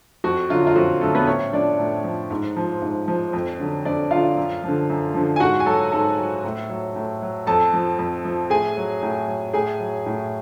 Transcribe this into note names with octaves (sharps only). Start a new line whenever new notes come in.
F2 F#4
D3 F#3 F4
F4
F2 F#4
D3 F#3 A3 A4
B3 B4
A2 C#4 C#5
F3 D4 D5
A2
F3
G#2
F3
G#2
F3
F2
D3 F#3
F2 D4 D5
D3 F#3 F4 F5
F#2
D3 F3
F#2
D3 F3
G#5
G#2 F#4 F#5
G#5
F#3 A4 A5
G#2 A4 A5
F#3
A2
F#3
A2
F#3
F2 A4 A5
F3
F2
F3
A2 G#4 G#5
F#3
A2
F#3
A2 G#4 G#5
F#3
A2